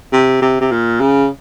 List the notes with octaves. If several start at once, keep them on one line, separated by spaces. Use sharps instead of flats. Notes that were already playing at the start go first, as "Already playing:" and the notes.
C3
C3
C3
A#2
C#3